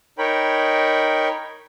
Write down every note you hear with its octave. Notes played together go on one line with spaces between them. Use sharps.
D#4 A#4 C#5 G5 B5